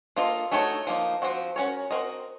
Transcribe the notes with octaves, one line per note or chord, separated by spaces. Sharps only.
A#3 F4 A4 D#5
A3 D#4 F#4 A4 C#5
F3 A#3 D#4
F3 C4 F#4
C#4 F#4 A#4 C#5
C4 F#4 A#4 D#5